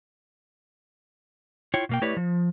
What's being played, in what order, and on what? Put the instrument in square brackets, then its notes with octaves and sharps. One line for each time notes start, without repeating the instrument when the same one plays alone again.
[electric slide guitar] E4 F4 C#5 G5
B2 A#3 G5
A3 E4 G4 B4 C#5 D5
F3